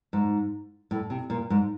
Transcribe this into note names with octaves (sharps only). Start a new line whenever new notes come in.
G#2
A2
C3
A#2
G#2